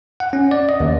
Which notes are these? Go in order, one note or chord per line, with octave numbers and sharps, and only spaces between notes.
F#5
C#4
D5
D#5
D#2